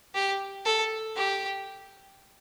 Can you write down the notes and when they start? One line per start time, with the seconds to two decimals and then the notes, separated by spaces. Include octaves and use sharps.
0.15 G4
0.65 A4
1.16 G4